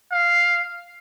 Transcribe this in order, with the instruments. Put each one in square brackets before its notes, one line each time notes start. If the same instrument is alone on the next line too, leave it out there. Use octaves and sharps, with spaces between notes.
[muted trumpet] F5